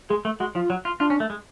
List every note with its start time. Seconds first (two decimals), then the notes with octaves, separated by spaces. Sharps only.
0.10 G#3 G#4
0.25 A3
0.40 G#3 F#4
0.55 F3 F4
0.70 F#3
0.85 F4
1.00 D4 F4
1.10 C#4
1.20 A3
1.30 G#3